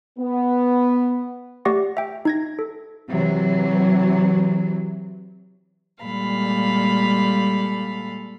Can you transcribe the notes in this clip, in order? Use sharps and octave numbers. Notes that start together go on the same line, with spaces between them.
B3
A3 G4 D5 F#5 C#6 A#6
E5 G5
D#4 G#6 A#6
A4
C3 E3 F#3
A#2 G3 G#3 A4 F5 B5